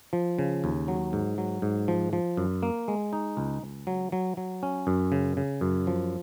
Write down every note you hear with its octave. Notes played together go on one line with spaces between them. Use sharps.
F3
C#3
D#2
F#3
G#2
F#3
G#2
F3
F3
F#2
A#3
G#3
D#4
C#2
C#2
F#3
F#3
F#3
C#4
F#2
C#3
C#3
F#2
F3